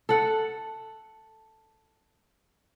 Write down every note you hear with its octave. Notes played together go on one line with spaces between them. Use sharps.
A4 F#5